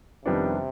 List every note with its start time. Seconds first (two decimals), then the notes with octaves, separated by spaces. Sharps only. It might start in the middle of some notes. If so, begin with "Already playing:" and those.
0.26 F2 C3 D#3 G3 B3 D4